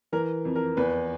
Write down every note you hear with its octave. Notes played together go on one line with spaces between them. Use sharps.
E3 A#4
F2
A#4
E2 B4